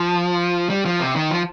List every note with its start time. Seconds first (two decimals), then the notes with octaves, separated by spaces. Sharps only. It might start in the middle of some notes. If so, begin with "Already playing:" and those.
Already playing: F3
0.70 G3
0.86 F3
1.00 C3
1.16 D#3
1.31 F3